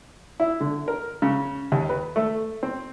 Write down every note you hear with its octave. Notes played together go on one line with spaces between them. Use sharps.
E4
D3
A#4
C#3
D#2
B4
A3
C4